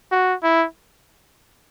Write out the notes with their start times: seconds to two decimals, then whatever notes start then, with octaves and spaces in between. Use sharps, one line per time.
0.12 F#4
0.43 E4